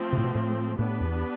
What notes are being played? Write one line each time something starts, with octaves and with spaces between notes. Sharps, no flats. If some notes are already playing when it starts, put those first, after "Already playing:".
Already playing: F3 A3 C4
A2 C3
B2
A2
A2 B3 D4 G4 B4
E2